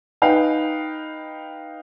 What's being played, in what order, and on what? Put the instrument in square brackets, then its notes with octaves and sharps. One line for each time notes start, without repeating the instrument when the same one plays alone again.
[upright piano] D#4 B4 F5 G5